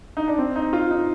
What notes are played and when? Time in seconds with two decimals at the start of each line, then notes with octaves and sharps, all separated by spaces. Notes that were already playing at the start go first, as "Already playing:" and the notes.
0.17 D#4
0.28 D4
0.38 C4
0.56 D#4
0.73 F4
0.91 D#4